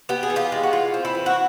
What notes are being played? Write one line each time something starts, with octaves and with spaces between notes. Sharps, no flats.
B3 G4
G#4
E3
F4 G4
G#3
F#4
E3 F4
C4
E4
E3
F#4